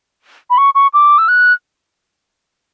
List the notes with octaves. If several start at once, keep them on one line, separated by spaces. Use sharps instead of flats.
B5
C#6
C#6
D6
E6
F#6